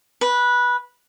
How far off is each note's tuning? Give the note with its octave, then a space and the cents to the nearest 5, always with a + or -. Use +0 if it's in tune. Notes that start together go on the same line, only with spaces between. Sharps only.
B4 -15